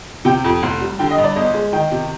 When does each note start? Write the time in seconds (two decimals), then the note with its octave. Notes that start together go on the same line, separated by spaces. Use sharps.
0.25 C3 G5
0.44 F2
0.63 F1
0.81 G3
0.99 D3 G5
1.11 D#5
1.18 G2
1.24 D5
1.36 G1 D#5
1.54 G#3
1.73 D#3 G5
1.91 C3